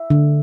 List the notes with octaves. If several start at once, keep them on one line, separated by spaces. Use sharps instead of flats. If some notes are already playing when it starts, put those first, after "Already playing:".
Already playing: E5
D3